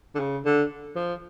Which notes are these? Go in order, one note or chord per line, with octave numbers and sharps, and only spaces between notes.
D3
C#3
D3
F3